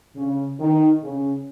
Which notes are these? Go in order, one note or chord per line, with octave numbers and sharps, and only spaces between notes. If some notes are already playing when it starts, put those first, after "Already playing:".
C#3
D#3
C#3